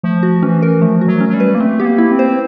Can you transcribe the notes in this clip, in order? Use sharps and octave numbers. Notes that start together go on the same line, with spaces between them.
F3 A3
F#4
E3 C#4
A#4
F3 A3
F#4
F#3
C#4
F#3
G3
B4
A#3
A3 C4
B3 G4
A#3
E4
C4
C5